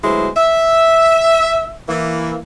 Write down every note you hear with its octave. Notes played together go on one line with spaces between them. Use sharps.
D2 F#3 G#3 B3 E4 C5
E5
E3 A#3 E4